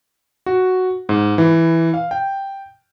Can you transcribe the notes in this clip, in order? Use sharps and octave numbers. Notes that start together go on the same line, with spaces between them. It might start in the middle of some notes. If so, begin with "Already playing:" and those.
F#4
G#2
E3
F5
G5